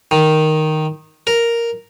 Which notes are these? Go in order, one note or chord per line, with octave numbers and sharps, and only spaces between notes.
D#3
A#4